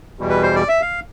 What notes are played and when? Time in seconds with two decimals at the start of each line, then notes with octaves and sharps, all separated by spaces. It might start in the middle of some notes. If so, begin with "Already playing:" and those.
0.19 E2 B2 G3
0.30 B4
0.42 C5
0.55 D5
0.68 E5
0.81 F5